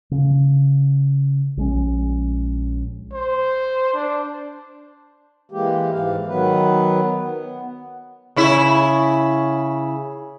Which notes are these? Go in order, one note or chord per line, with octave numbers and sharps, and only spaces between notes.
C#3
A#1 G#3 C#4
C5
D4
E3 G#3 A#3 G4
G#2 E3 F5
D#3 F#3 B3 B4
B3
C#3 E4 E5